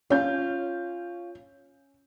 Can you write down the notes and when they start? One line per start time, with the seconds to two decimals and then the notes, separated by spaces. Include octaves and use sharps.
0.10 C#4 F4 C#5 G6